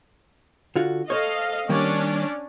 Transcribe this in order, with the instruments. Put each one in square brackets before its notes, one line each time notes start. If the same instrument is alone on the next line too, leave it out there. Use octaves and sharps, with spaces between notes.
[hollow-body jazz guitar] D3 F4 F#4
[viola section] A4 D#5 F5 [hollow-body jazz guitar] C5 C#5
[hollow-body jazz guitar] D#3 G3 A#3 [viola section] C#4 D4 D5